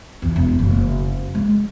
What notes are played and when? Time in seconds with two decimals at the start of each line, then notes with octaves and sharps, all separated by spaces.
0.22 E2
0.36 E1
0.59 F#1
1.35 G#3